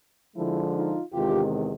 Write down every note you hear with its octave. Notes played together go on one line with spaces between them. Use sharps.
D3 F3 G#3 E4
D#4 F4
E2 C3 D#3 G#3 F4 G4